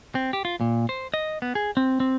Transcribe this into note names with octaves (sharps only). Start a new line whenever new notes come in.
C4
G4
F4
A#2
C5
D#5
B3
G#4
C4
C4